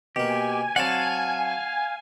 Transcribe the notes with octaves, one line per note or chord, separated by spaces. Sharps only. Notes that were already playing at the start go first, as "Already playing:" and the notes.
B2 A#3 G4 G#5
F#3 C4 D5 F5 F#5 A5